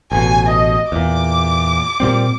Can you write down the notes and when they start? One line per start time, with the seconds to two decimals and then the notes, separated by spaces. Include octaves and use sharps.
0.12 A1 B2 G#5
0.47 D#5
0.92 E2 A#2 D6
2.00 A#2 G3 C4